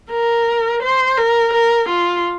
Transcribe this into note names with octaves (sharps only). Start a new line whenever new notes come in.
A#4
C5
A#4
A#4
F4